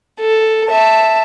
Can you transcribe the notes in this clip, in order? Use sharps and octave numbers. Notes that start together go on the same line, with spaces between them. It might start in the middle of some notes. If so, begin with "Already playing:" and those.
A4
E5 A5